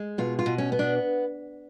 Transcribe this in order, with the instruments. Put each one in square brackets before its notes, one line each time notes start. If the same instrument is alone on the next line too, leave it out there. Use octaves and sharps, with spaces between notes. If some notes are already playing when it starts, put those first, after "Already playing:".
Already playing: [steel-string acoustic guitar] G#3
B2 F4
F4
B2
C#4
B3
D4